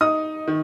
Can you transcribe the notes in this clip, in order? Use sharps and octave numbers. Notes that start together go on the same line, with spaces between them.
D#4 D#6
D#3